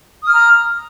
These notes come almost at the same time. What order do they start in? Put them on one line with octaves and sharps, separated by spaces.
D#6 F6 A#5